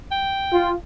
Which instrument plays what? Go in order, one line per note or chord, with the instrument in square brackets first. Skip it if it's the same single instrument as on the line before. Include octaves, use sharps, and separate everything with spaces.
[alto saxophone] G5
[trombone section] F4